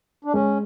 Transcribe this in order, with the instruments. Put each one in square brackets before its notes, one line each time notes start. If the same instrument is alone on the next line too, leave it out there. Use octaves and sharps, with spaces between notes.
[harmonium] D4
[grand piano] G#3 [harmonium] C#4